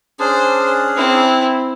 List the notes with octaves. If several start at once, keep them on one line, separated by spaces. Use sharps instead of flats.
C#4 D4 G#4 C5
C4 E4